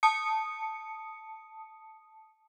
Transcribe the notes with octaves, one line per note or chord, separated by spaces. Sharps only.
A5 D#6 C#7